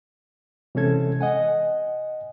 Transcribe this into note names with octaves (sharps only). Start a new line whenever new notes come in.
C3 E3 G#3 C#4 A4 G#6
D#5 F#5 G#5